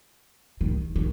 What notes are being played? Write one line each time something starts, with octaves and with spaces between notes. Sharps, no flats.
D#3
D#3